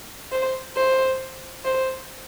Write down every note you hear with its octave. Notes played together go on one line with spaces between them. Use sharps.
C5
C5
C5